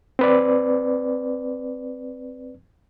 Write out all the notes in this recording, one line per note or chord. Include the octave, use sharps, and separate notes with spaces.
C4 B4 D5